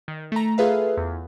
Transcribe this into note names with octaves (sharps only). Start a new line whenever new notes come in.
D#3
A3 A#5
F4 G#4 A4 B4 E5 F5
E2